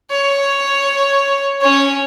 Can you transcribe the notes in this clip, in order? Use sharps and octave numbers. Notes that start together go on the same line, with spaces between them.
C#5
C#4 C#5